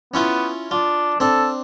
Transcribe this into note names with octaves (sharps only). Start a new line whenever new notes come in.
B3 C#4 E4 F4
D4 F4
C4 D4 A4